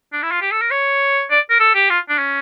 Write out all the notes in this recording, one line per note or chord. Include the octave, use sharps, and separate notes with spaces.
D4
E4
F4
G4
A4
A#4
C#5
D5
A#4
A4
G4
F4
D4
C#4